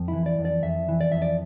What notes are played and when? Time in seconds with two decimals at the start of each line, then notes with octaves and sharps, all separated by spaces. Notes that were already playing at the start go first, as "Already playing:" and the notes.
Already playing: F2
0.08 E4
0.13 E3
0.26 D5
0.39 F2
0.45 D5
0.63 F2 E5
0.88 E3
1.01 D5
1.12 F2 E5
1.22 D5